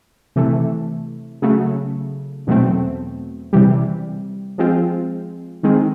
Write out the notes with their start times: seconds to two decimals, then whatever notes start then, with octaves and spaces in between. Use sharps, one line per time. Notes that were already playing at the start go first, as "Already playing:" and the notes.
0.36 C3 E3 A3
1.42 C#3 F#3 A3
2.47 E2 B2 F#3 A3 C4
3.53 C3 E3 G3
4.58 F3 G#3 C4 F4
5.63 D#3 G#3 C4